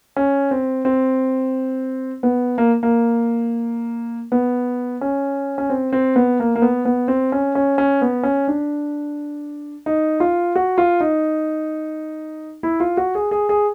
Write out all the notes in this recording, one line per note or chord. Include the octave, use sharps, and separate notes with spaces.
C#4
C4
C4
B3
A#3
A#3
B3
C#4
C#4
C4
C4
B3
A#3
A#3
B3
B3
C4
C#4
C#4
C#4
B3
C#4
D4
D#4
F4
F#4
F4
D#4
E4
F4
F#4
G#4
G#4
G#4